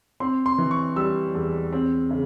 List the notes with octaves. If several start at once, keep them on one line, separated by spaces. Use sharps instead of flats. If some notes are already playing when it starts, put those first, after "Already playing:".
C4 C6
C6
E3
C#6
G3 E6
E2
C4
C#3